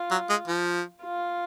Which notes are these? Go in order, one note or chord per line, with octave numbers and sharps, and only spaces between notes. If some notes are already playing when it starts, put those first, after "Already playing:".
Already playing: F4
F#3
G#3
F3
F4